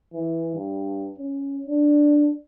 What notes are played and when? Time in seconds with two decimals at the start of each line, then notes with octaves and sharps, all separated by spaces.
0.14 E3
0.55 G2
1.18 C#4
1.67 D4